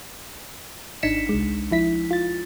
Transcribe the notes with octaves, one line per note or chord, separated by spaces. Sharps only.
G#1 D4 D#4 B6 C#7 E7
C2 G#3
F3 E4 B6
F4 A6